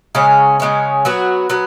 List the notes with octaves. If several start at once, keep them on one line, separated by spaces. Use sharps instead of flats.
C#3 G#3 C#4
C#3 G#3 C#4
F#3 B3 F#4
F#3 B3